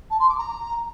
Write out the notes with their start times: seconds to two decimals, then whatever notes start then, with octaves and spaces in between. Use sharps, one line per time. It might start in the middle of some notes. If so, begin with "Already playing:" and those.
0.10 A5
0.19 C6
0.28 D6
0.38 A#5